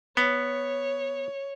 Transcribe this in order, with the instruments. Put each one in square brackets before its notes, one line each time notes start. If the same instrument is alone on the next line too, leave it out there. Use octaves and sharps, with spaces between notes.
[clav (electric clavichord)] B3 [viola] C#5